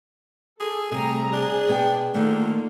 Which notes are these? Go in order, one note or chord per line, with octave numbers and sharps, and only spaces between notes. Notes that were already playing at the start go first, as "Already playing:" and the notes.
G#4 A4
C3 G3 A3 G#4 A#5
D4 G#4
B2 B3 G5
D3 D#3 A3 A#3 F4